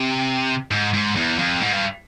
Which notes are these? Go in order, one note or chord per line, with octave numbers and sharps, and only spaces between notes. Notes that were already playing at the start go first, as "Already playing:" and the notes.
Already playing: C3
G#2
G#2
E2
F2
G#2
G2